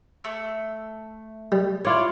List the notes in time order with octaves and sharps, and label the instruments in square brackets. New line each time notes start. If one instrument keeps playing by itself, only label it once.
[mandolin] A3 E6
[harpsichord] G3
[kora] E4 F4 C#5 [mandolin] D5